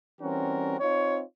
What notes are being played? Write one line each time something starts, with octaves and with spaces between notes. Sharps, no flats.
E3 G3 C4 C#4 F#4 A#4
C4 D#4 F4 C#5